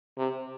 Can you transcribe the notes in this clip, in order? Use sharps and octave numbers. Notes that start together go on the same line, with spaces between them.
C3